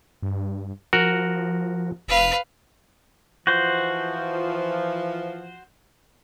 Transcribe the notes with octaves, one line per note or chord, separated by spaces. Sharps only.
G2
F3 F#4 A#4
F1 B4 F5
E3 F3 F#4 C5